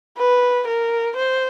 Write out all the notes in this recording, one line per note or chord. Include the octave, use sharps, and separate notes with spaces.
B4
A#4
C5